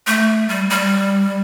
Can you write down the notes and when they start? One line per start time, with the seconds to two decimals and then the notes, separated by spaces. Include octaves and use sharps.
0.07 A3
0.48 G3
0.71 G3